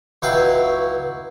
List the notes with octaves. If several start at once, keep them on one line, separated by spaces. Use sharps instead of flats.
C#2 F#3 E4 B4 F5 G5